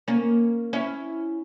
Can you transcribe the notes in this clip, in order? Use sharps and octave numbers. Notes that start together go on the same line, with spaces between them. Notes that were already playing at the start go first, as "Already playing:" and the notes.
A#3 C#4
C#4 E4